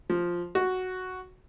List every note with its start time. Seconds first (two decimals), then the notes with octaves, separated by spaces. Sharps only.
0.10 F3
0.55 F#4